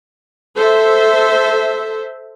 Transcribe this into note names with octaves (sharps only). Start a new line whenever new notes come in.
A4 C5 E5